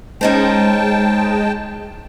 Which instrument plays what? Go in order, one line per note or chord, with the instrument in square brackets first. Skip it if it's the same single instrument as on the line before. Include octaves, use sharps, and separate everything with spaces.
[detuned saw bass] G#3 [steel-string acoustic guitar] C#4 D#4 C5 [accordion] G5 A5